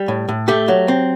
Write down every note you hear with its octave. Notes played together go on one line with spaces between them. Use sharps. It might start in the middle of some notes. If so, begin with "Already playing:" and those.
Already playing: G3
A2
A2
A3 G4
F#3
C4